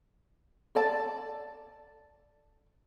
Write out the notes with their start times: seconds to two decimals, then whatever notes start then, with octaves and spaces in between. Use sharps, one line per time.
0.75 A4 D5 A5